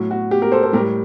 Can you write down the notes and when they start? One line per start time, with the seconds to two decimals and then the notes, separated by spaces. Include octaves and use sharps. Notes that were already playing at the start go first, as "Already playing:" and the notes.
Already playing: A2 F#3
0.11 F#4
0.31 G4
0.42 G4 A#4
0.52 A4 C5
0.63 A4 C5
0.73 A2 G3 G4 A#4